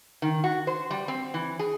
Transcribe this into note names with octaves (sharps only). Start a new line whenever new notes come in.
D#3
F#4
C5
G3
C4
E3
G#4